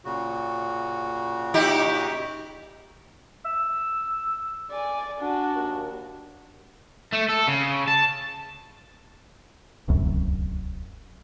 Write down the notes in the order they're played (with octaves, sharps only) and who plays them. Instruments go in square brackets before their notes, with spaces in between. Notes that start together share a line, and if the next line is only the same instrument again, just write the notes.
[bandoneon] A#2 C#3 F#4
[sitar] D#4 E4 G4
[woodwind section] E6
[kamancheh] D5 G#5
D4 F#4
[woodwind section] D#2
[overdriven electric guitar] A3
A4
C#3
A5
[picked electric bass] D1 C2 F#2